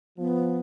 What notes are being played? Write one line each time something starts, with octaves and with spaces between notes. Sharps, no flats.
F3 B3